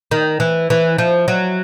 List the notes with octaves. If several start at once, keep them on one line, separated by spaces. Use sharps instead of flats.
D#3
E3
E3
F3
F#3